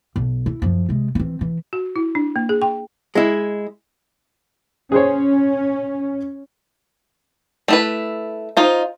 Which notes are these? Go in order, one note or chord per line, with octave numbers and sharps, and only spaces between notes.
B1
E4
F#2 F3
C3 G#3
E3 C4
E3
F#4
E4
D4
A#3
G#4
G5
G#3 E4
C#4 G#4 C5 C#5
A3 E4 B4
D#4 F4 C5